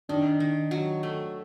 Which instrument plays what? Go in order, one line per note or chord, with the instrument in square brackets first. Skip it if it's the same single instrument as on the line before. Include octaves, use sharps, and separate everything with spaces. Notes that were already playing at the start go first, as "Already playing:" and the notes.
[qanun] D#3 [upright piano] D4
[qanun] D#3
F#3
A3